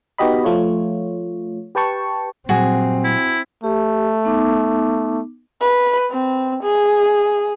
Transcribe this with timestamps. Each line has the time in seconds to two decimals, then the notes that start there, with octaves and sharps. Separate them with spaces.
0.18 B3 D#4 F#4 G4 D#5 B5
0.44 F3 A3 F4 C#5
1.75 G4 B4 G5 A5 C#6
2.49 A#2 F#3 G3 C4 F#4 G#4
3.05 E4
3.64 A3 G4
4.25 B3 D#4 D6
5.61 B4
6.10 C4
6.63 G#4